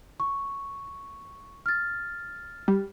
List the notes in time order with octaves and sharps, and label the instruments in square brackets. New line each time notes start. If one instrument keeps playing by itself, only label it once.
[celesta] C#6
F6 A6
[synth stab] G3